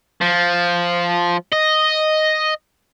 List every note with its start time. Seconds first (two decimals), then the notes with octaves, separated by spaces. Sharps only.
0.21 F3
1.52 D#5